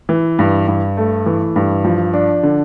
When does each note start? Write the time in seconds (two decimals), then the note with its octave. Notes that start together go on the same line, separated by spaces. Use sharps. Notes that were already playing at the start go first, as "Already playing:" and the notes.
0.09 E3
0.39 G2
0.67 G2
0.97 A3
1.26 E3
1.56 G2
1.84 F3
2.14 D4
2.43 D3